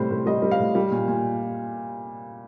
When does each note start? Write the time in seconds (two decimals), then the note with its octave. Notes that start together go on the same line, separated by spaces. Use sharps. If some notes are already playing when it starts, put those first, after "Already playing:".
Already playing: A2 C3 G3 C5
0.10 A2
0.26 G3 D#5
0.42 G3
0.51 F5
0.59 A2
0.75 G3
0.91 A#2
1.08 A#2